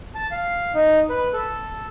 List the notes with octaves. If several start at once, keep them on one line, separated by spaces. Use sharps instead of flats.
A5
F5
D#4
B4
A4